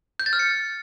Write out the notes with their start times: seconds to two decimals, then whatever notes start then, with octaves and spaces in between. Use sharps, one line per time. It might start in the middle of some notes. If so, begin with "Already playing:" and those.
0.19 G6
0.26 A6
0.33 F6
0.39 C#7